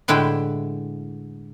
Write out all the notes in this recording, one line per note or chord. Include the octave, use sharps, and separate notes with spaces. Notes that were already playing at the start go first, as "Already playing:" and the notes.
A2 D3 G#3 E4 B4 G5